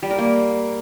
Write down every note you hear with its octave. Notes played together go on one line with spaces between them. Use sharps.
G3
A#4
A#3